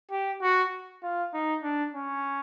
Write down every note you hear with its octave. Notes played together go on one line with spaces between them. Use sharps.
G4
F#4
F4
D#4
D4
C#4